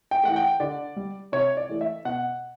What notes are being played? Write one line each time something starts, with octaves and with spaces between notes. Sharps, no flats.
G5
E3 A3 F#5
G5
D3 D5
G3
C3 C#5
D5
E3 A3
E5
B2 F#5